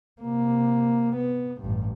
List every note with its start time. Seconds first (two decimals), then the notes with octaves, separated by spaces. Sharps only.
0.22 C3 A#3
1.17 B3
1.61 A1 G2